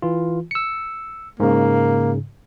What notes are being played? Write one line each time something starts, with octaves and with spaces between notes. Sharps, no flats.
E3 F4
E6 C#7
G#2 C#3 A#3